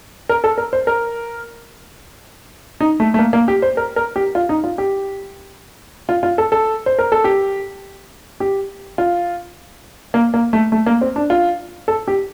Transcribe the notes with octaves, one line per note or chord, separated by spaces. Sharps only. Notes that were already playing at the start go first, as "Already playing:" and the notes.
A#4
A4
A#4
C5
A#4
D#4
A3
A3
A#3
A#3
G4
C5
A#4
A#4
G4
F4
D#4
F4
G4
F4
F4
A4
A4
C5
A#4
A4
G4
G4
F4
A#3
A#3
A3
A3
A#3
C4
D4
F4
A4
G4